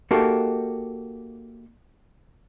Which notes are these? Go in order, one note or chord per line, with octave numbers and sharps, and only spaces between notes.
A#3 D#4 F#4 G4 A4